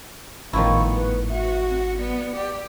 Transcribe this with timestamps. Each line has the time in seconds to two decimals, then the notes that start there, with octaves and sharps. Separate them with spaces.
0.53 G#1 A2 D#3 F3 B3 E4 C#6
0.96 B4
1.29 F#4 E5
1.69 C4
1.99 B3 D5
2.36 G4